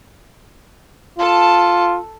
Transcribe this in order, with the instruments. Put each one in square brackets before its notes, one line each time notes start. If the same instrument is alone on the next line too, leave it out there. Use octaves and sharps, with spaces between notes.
[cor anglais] F4 [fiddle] A4 A5